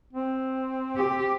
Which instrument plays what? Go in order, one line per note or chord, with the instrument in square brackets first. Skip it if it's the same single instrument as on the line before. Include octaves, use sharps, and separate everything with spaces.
[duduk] C4
[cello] G4